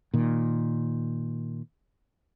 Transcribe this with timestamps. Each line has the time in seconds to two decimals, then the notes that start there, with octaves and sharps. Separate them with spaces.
0.14 A#2 D#3